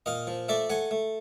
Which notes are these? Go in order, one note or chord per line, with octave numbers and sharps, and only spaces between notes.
A#2 D#5 F5
F3
A3 D5 E5
A3 F#5 G#5
A3